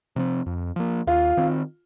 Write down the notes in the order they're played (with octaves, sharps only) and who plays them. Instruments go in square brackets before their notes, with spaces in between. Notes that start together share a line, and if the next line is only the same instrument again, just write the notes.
[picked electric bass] C3 F3 C4
F2
F3 A#3
[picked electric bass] D#2 [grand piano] F4
[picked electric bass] D#3 C4